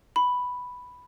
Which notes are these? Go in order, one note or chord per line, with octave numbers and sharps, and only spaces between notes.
B5